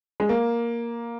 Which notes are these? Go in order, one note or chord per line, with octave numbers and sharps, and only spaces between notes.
G#3
A#3